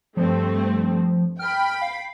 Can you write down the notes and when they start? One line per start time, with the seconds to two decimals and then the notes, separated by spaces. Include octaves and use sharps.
0.17 G2 F3 A3 C4
1.39 G5 B5 F6
1.82 F5